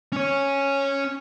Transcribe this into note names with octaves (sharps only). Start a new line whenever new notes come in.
C#4 C#5